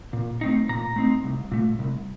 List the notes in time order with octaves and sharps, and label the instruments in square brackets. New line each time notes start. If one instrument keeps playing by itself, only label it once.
[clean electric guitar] A#2
A3 C4 D#4
A#2 A#5
A3 C4 D#4
C2
A#2 A3
C2